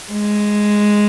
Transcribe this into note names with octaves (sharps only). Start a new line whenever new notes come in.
G#3